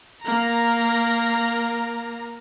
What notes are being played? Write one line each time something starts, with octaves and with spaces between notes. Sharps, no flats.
A#3 A#5